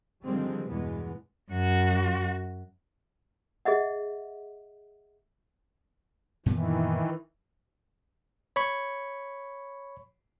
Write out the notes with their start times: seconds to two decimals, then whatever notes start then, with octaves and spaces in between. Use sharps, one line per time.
0.24 D3 D#3 F3 G3 G#3 C4
0.69 E2 G2 B2 E3 G#3 B3
1.51 F#2 F#4
3.65 G#4 D#5 E5 F#5
6.46 F#2 A#2 D#3 E3 B3
8.56 C#5 B5 C#6